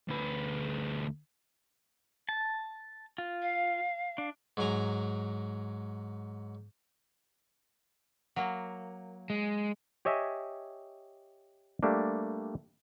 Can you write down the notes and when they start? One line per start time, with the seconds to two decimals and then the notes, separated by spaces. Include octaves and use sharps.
0.08 D2 B4
2.29 A5
3.18 F4
3.42 F5
4.18 D4
4.57 G#2 F#3 G#5 A#5
8.36 F#3 A#3
9.30 G#3
10.05 G4 C#5 D#5 E5 G#5
11.83 G3 A3 A#3 D4